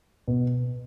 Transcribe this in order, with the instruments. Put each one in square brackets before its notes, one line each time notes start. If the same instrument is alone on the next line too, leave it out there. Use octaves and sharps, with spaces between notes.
[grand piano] B2